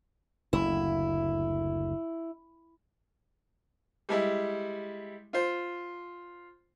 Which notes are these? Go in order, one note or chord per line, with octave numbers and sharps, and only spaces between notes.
F#1 D2 E4
G3 G#3 E4
F4 C5